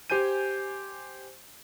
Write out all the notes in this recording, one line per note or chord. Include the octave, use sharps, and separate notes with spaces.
G4 C5 G#5 G6 D#7